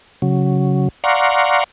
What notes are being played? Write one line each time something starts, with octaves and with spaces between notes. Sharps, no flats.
C#3 F#3
D5 F5 F#5 A#5 C6 C#6